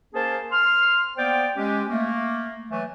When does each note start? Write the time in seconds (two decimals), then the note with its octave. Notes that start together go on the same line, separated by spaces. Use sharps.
0.14 A#3 C#4 G#4 A#4 C5 A5
0.51 C6 F6
1.17 A#3 B3 C5 D5 G5
1.56 G#3 C#4 G4
1.89 A3 A#3
2.70 E3 F#3 A3